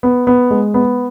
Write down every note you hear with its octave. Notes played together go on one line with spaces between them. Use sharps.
B3
B3
G#3
B3